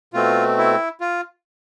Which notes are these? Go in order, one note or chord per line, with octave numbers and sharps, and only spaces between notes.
B2 A3 C4 F4
E4
F4